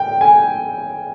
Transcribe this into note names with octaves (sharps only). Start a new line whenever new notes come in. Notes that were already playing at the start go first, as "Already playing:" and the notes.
Already playing: G5
G#5